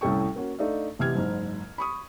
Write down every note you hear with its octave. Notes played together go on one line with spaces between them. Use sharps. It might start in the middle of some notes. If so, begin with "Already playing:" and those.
C2 A2 C#4 A4 G5 C#6
A#3 C#4 F#4
A3 D4 D#4 D5 E5 F5
A1 C3 G4 F6 G#6
F#1 G#2
B5 C#6 D#6